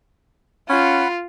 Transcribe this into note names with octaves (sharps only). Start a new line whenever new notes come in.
C#4 F4 F#5 B5